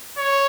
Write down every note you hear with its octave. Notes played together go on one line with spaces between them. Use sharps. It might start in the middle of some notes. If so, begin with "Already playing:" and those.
C#5